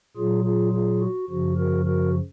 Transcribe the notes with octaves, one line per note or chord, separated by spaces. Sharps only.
A#2 F#3 F4 G#4
F4 G#4
F4 G#4
F#4
F#2 C#3 F3 F#4
F#4 A#4
F#4 A#4